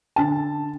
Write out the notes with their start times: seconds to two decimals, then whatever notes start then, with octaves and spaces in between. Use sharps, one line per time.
0.16 D3 A5